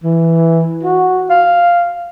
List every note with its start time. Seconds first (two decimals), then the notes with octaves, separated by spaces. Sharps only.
0.04 E3
0.83 F#4
1.30 F5